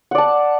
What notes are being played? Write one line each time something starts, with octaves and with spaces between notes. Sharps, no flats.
D5 F#5 A5